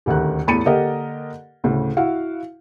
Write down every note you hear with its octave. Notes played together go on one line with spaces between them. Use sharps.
D#1 D2 D#3 F#6
E2 A2 B5 A6 C#7 D#7
D3 A#3 G4 A#4 D#5
D2 A2 C#3
E4 F#4 F5 F#5